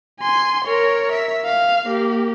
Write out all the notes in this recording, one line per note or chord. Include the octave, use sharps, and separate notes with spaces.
G#5 C6
A#4 C#5
E5
F5
A#3 G4